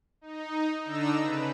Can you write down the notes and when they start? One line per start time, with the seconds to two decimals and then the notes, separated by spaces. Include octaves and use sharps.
0.21 D#4
0.84 D3 D4 D#4 A#5 E6
1.18 C#3 B4